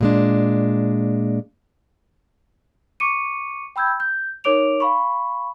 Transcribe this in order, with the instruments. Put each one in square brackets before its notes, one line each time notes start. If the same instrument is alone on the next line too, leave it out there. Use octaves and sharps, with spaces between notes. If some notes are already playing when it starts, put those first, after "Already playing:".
[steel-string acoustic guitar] A#2 G#3 D4
[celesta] C#6 D6 C#7 D#7
G5 B5 E6 G6 G#6
G6
D#4 A#4 C#5 D6 D7 F7
F5 B5 C#6